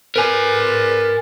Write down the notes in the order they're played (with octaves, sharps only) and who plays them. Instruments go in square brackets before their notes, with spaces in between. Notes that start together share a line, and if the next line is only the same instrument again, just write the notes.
[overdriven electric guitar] A#4 G#5 [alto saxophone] B4